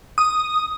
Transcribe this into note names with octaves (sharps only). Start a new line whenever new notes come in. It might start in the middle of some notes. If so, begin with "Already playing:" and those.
D#6